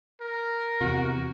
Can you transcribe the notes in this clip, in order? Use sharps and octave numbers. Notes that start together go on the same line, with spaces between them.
A#4
E2 C3 F#4